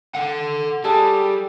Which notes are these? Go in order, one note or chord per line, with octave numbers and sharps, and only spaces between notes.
A4 F#5
G3 G#4 A4 F#5